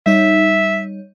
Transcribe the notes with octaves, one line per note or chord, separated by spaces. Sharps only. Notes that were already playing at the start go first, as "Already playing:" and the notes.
G3 D#4 C#5 E5